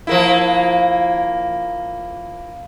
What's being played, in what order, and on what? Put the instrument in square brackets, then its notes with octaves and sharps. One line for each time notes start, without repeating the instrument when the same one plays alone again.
[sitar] F3 A#3 E4